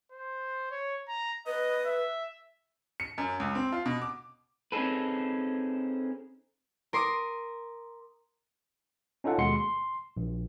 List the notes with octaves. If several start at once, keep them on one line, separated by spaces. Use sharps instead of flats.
C5
C#5
A#5
B4 D#5
E5
C#7
F#2
C#2
C4
F4
B2
D6
C4 C#4 D#4 G#4 A4 B4
A#4 C6 D6 D#6
C#4 D#4 F4 A4 F#5
D#2 B2 G#3 C6 C#7
C6
A#1